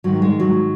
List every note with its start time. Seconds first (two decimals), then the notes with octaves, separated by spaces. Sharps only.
0.04 G#2 D#3 F#3
0.22 G#3
0.40 F#3